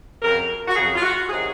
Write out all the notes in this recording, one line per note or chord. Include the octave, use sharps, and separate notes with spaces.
F2 C#3 F#3 A#4
F#4
F2 C#3 F#3 G#4
F4
F#4
C3 D#3 F#3 G#4